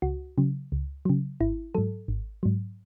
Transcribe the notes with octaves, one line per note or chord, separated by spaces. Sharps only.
C#2 F#4
C#3 F#3
C#2
C#3 F#3
G#1 E4
G#2 F#3 A4
G#1
G#2 F#3